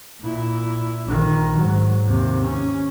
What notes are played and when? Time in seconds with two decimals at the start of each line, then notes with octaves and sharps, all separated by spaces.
0.21 A#2 E4
1.06 A#1 D#3
1.57 G#2 F#3
2.06 D#2 C3
2.43 C#4